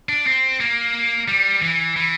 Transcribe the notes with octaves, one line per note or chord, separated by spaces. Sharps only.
D4
C4
A#3
G3
E3
E3